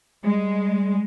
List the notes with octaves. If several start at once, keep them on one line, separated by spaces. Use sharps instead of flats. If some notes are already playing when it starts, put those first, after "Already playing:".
G3 G#3